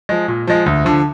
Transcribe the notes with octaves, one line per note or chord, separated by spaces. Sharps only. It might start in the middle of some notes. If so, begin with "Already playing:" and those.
F3 G#3
A#2
F3 G#3
D2
D3 F3